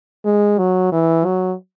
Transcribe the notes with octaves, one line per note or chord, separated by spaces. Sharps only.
G#3
F#3
E3
F#3